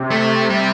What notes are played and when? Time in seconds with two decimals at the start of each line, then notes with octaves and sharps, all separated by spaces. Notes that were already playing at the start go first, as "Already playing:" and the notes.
Already playing: C3
0.11 A3
0.50 G3